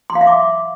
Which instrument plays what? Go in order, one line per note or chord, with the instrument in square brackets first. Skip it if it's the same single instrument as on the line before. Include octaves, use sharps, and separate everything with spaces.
[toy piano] C6
F5
E5
D6